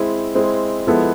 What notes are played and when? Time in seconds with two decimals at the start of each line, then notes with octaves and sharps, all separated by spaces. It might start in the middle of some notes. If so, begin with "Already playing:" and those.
Already playing: G#3 C4 E4 G#4
0.35 G#3 C4 E4 G#4
0.87 F3 G#3 B3 E4 A4